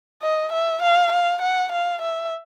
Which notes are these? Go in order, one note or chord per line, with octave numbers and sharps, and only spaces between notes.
D#5
E5
F5
F5
F#5
F5
E5